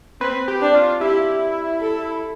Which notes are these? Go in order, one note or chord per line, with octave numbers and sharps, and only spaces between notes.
C4 B4
G4
D4
F4
E4 G4
A4